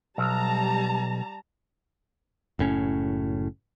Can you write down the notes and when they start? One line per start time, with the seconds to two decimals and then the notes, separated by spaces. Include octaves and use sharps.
0.18 B1 G3 A5 A#5
2.59 F#1 A2 C#4